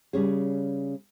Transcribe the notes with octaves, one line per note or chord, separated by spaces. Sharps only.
C#3 G3 C#4 G#4